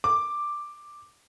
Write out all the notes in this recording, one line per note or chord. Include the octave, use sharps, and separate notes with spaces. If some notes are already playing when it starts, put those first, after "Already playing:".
D6